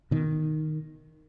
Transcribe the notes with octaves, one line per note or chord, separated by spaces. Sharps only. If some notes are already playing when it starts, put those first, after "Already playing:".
B2 D#3